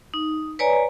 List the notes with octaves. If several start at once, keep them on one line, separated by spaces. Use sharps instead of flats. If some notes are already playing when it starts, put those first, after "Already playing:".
D#4
B4 C#5 D5 G#5 A#5